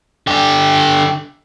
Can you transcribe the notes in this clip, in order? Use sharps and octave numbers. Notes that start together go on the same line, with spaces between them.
D3 G4